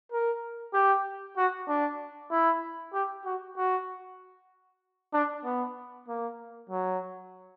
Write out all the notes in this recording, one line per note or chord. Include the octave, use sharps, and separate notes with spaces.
A#4
G4
F#4
D4
E4
G4
F#4
F#4
D4
B3
A#3
F#3